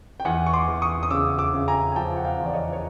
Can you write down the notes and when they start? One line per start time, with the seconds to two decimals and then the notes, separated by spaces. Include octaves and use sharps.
0.20 G5
0.25 E2 F#5 G#5
0.46 C#6
0.53 C6 D6
0.68 E2
0.82 C#6 D#6
1.03 D#6
1.11 C#3 D6 E6
1.38 D6 E6
1.53 C#3
1.68 G#5 A#5
1.92 G#5
1.96 F3 G5 A5
2.17 F#5
2.24 F5 G5
2.39 E2
2.46 D5
2.54 C#5 D#5
2.73 C#5